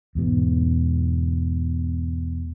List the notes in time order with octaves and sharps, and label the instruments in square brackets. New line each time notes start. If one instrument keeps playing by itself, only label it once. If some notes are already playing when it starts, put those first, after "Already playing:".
[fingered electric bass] E2 G#2 B2